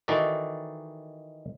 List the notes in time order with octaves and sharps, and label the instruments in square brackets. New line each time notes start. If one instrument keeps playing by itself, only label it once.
[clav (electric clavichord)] D#3 E3 D#4 F#4 A4 D5